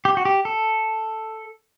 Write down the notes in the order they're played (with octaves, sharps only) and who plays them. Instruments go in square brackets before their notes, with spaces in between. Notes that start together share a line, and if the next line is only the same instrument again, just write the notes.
[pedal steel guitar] G4
F#4
G4
A4